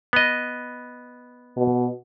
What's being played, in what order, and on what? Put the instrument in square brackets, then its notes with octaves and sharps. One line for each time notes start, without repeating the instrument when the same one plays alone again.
[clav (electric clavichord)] B3 D#5
[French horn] B2